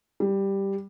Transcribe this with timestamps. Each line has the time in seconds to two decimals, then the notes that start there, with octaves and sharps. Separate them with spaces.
0.20 G3